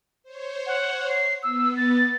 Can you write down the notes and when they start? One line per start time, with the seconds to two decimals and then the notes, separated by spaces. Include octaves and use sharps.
0.23 C5 C#5
0.67 F#5
1.10 C7
1.43 B3 E6
1.77 A6